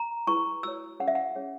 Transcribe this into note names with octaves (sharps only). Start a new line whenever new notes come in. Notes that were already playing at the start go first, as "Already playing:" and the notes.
Already playing: A#5
E4 G#4 B4 C#6
F#4 C#5 E6
C#4 G#4 C#5 F#5
E5
F#5
C#4 G#4 C#5